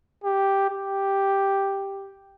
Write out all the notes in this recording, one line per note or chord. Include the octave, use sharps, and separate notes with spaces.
G4
G4